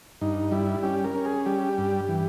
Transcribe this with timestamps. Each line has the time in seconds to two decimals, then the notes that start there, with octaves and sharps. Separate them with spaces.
0.21 G2 D#4
0.52 G3 E4
0.83 C#4 G4
1.04 A#4
1.15 C#4
1.25 G#4
1.46 G3 G4
1.78 G2
2.09 E3